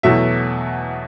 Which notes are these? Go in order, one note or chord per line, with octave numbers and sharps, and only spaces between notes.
E2 B2 F#3 A3 E5